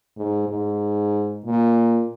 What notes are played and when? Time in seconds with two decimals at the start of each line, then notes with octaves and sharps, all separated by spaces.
0.17 G#2
0.49 G#2
1.46 A#2